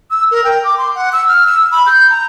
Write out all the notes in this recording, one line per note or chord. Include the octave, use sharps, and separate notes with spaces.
E6
A#4
G5
D6
C6
F#5
E6
F6
E6
B5
G6
A#5